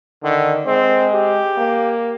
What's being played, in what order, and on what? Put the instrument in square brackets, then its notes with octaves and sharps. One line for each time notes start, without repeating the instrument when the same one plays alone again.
[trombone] D3 [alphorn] D#3
[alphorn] G#3 [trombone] C4
[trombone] G4
[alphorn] A#3